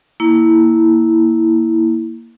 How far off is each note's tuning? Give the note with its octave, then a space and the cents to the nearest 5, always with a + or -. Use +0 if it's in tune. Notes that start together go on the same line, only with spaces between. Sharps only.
A#3 +0 E4 -10